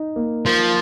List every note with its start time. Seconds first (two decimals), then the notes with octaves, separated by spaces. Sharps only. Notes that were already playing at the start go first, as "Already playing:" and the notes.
Already playing: D#4
0.16 A#3
0.45 F3 A#4